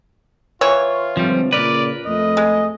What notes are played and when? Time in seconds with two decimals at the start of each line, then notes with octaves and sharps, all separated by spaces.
0.61 E3 F4 C#5
1.17 G#2 D3 F3 G3 C4
1.53 A#2 C#3 A#4 B4 D5
2.06 F2 A3 D#5
2.37 G#3